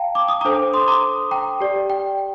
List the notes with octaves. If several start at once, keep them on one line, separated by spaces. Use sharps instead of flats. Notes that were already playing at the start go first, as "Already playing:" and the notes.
Already playing: F5 G5 A5 A#5
D6
D#6
D4 A4 C5 A#5 D6
C6 D#6
A#5 D6
G5 A#5
G4 D5
G5